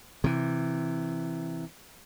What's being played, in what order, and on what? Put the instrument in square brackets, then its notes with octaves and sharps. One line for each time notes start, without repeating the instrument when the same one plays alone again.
[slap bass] C3 E3